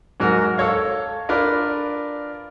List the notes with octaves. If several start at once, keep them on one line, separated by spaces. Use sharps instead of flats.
G#2 F#3 F#4 A#4
A4 C#5 F5
D4 F4 A#4 B4 D5